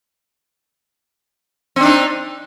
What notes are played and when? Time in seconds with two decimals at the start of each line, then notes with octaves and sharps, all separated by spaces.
1.76 C4
1.80 D4
1.85 D#4